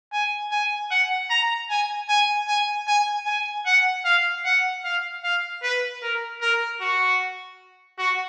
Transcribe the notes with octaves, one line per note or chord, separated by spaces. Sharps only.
G#5
G#5
F#5
A#5
G#5
G#5
G#5
G#5
G#5
F#5
F5
F#5
F5
F5
B4
A#4
A#4
F#4
F#4